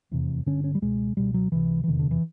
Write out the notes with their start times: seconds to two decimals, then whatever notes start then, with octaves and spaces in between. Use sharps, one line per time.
0.11 F1 E2 C3
0.46 G1 G2 D3 C#4
0.64 C#4
0.75 G3
0.82 C#2 B2 G#3
1.17 C#2 B2 G3
1.34 F#3
1.52 C#2 C3 E3
1.84 E3
1.88 F1 E2 C3 D#3
1.99 D3
2.11 E3